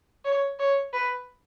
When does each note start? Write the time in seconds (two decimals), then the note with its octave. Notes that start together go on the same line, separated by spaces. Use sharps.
0.25 C#5
0.59 C#5
0.93 B4